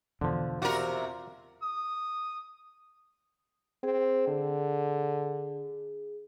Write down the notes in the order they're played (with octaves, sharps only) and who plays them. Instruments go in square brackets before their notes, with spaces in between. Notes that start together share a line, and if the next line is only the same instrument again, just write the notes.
[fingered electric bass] E2 B2 [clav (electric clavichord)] D3 F3
[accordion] C3 [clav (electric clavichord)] F4 D5 [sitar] F#4 A#4
[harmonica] D#6
[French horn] C4 [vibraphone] G#4
[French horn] D3